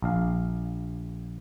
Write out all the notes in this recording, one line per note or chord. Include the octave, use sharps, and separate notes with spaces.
A#1 F5